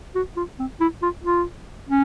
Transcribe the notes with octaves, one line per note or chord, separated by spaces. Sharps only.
F#4
F4
C4
E4
F4
F4
C#4